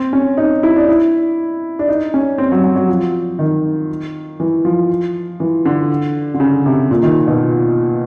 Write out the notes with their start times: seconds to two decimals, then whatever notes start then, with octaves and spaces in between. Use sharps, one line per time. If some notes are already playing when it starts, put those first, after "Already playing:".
Already playing: C4
0.13 C#4
0.37 D#4
0.63 E4
0.76 D4
0.88 E4
1.79 D4
1.89 D#4
2.14 C#4
2.38 C4
2.52 F#3
2.64 F#3
2.76 F#3
2.88 F3
3.39 D#3
4.40 E3
4.65 F3
5.40 E3
5.65 D3
6.34 D3
6.40 C#3
6.66 C3
6.91 A#2
7.03 D#3
7.27 B2